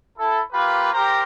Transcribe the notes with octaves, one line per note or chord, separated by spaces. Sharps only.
E4 A4
A#3 F4 G4 B4
G4 A#4 C5 A#5 C6